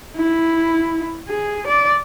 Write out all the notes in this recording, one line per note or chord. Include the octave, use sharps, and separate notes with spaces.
E4
G#4
D5